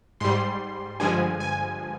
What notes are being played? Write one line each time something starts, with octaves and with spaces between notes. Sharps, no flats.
G#2 G3 C6
G2 D3 F3 G#3 G#5
G#5